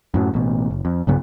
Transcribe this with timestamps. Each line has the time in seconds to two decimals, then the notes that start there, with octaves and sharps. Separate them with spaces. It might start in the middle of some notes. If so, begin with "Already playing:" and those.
0.14 F#2 A2 F#3
0.34 A1 B2
0.70 F#1
0.85 F2
1.07 B1 G2 C#3 B3